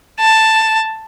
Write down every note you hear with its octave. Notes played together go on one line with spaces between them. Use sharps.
A5